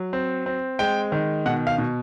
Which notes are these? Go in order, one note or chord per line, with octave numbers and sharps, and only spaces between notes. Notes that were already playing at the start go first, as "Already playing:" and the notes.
Already playing: F#3
C4
C4
G#3 G5
D#3
B2 F#5
F5
B2